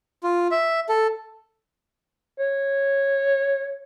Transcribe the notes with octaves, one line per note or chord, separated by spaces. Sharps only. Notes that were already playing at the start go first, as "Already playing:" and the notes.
F4
E5
A4
C#5